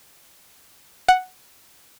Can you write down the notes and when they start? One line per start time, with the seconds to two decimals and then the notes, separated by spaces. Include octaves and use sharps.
1.08 F#5